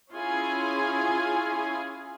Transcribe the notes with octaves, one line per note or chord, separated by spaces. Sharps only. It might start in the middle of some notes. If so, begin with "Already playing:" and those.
C#4 E4 F4 G#4 G#5